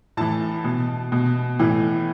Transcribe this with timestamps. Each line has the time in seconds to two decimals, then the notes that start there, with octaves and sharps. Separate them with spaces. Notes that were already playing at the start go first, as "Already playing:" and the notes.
0.17 A2 E3 A5
0.64 B2
1.12 B2
1.59 A2 E3